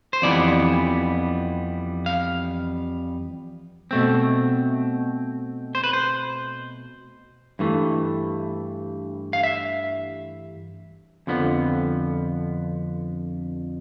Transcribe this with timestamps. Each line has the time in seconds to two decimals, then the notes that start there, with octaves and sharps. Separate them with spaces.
0.13 C5
0.22 F2 E3 G3 B3 D5
2.06 F5
3.91 B2 A3 C4
5.75 C5
5.84 B4
5.93 C5
7.59 G2 E3 A3
9.33 F5
9.43 E5
11.27 F2 D3 F3 B3